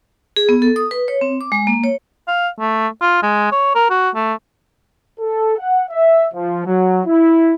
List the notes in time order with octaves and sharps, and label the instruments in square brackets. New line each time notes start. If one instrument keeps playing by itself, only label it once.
[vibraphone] G#4
B3
A4
D#6
B4
C#5
C4
D6
G#3
A#3
C#5
[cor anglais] F5
A3
F4
G#3
C#5
A#4
F#4
A3
[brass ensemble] A4
F#5
E5
F3
F#3
E4